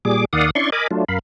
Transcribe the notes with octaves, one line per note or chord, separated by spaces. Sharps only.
A#2 G3 G#4 D6
D#2 D#3 D5 F5 F#5 D#6
C#4 D4 E4 D5 C6 C#6
A#4 D#5 G#5 B5 D6
F#3 A3 D4 F4
F#2 A#4 F5 B5